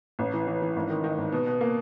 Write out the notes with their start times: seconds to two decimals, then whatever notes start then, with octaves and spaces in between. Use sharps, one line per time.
0.19 A1
0.33 E3
0.47 E3
0.62 E3
0.76 G#1
0.90 D#3
1.04 D#3
1.18 G#1
1.32 B2
1.46 B2
1.61 A#3